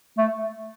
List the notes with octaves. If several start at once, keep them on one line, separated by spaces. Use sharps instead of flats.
A3